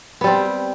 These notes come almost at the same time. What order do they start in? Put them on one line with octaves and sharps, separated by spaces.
B3 G3 C4